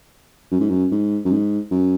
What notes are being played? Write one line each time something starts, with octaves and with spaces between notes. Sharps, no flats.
F#2
G#2
F#2
G#2
F#2
G#2
F#2